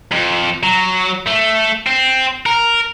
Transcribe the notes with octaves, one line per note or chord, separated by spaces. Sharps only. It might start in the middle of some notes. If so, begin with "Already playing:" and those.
F2
F#3
A3
C4
A#4